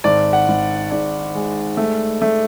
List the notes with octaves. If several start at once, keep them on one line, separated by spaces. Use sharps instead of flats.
G#1 D5
F#5
G#1
G#2 D5
G#3
A3
A3